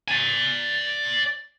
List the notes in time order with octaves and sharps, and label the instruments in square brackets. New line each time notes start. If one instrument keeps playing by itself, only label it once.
[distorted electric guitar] D5 G#5